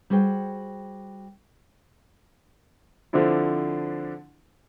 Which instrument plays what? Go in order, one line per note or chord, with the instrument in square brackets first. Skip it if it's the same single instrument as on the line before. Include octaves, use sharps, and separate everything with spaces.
[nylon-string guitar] G3 F#4 G#4 C5 G5
[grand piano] D3 F3 C4 D4 E4